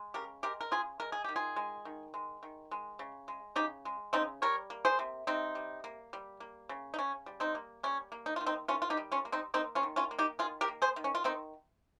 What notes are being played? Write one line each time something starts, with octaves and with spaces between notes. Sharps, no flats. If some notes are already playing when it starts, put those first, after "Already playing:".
Already playing: G#3
C#3 G4 A#4
G#3 G4 A#4
A#4
C#3 F4 G#4
G#3 A#4
G#4
D#3 G4
F4 G#4
G#3
D#3
G#3
D#3
G#3
C#3
G#3
C#3 D#4 G4
G#3
C#3 C4 D#4
G3 A#4 C#5
A#3
G#4 C5
C3
C3 C4 D#4
G3
A#3
G3
A#3
C#3
D#4
C#3 C#4
G3
C4 D#4
A#3
G3 C#4
A#3
D#4
D#3 F4
C4 D#4
D#3 C#4 F4
F4
D#4 G4
G3
C#4 F4
A#3
C4 D#4
A#3 C4 D#4
C#4 F4
D#3
C#4 F4
A#3
D#4 G4
D#3 F4 G#4
G4 A#4
A#3
G#4 C5
D#3
C#4
F4
D#3 C4 D#4